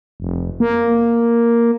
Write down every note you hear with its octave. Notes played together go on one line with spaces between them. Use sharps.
F1
A#3